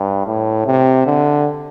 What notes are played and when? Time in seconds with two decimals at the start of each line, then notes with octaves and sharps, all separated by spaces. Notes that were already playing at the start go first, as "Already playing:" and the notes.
Already playing: G2
0.27 A2
0.66 C3
1.06 D3